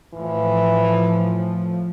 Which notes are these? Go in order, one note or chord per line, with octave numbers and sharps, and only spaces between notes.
A2 E3 F3